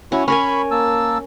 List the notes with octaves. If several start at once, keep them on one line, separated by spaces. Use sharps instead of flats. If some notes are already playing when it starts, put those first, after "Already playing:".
C#4 E4 F#4 C#5
C#4 A#4 G#5 B5 C#6
A#3 A5 E6